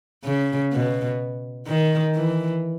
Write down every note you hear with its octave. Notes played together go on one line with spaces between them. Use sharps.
C#3
B2
D#3
E3